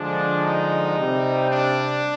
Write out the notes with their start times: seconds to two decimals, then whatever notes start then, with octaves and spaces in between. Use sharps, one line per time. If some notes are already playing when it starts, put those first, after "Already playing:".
Already playing: D3 F3 G#3 D4
0.44 D#4
0.97 C3 G3 C4
1.49 D4